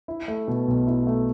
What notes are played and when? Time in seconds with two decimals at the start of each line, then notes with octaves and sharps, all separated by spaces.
0.08 E4
0.28 A3
0.48 B2
0.68 B1
0.87 E4
1.07 A3